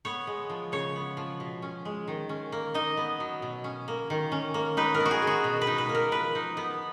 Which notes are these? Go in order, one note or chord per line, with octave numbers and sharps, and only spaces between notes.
B3 C#5
G#3
F3
C#3 C#5
B3
F3
B2
C#4
G#3
D#3
C#4
A#3
D#4 D#5
B3
F#3
B2
C#4
A#3
D#3
C#4
A#3
D#4 B4
A#4
B3
F#4
G#4
G#3
F#4
B2
B4
D#4
B4
A#3
A#4
F3 B4
D#4
B3